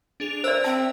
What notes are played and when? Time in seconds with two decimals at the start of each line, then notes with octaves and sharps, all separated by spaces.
0.20 D4 G#4 F7
0.44 A#4 C5 D5 E5 E6
0.64 C4 A5